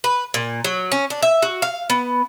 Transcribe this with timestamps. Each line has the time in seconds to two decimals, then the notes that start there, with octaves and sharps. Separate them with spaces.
0.04 B4
0.34 A#2
0.64 F#3
0.92 C#4
1.10 D4
1.22 E5
1.42 F#4
1.62 F5
1.90 B3